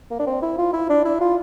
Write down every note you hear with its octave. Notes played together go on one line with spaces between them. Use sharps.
A#3
D4
C4
E4
F4
E4
D4
E4
F4